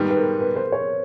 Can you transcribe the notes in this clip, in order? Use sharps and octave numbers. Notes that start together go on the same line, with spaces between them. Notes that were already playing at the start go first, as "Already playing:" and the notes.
Already playing: G#2 D#3 G3 B3
B4
A#4
B4
C5
C#5